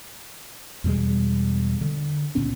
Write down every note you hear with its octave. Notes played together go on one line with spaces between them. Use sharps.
E2 B2 G3 G#3
D3
C#2 A#2 B3 C#4